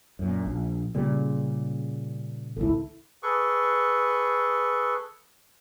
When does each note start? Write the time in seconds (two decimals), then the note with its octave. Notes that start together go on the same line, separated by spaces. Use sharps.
0.19 F#2 A#2
0.45 A#1
0.95 A#2 C#3 G3
2.57 G#1 C#2 E4 A4
3.23 G#4 A4 B4 C#6